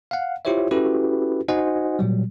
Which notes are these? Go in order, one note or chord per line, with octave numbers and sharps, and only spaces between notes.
F5 F#5
E4 F4 G4 C5 C#5 E5
C#4 E4 F#4 G4 A4 B4
D#4 F#4 C5 D#5 F#5 G#5
A#2 F#3 G3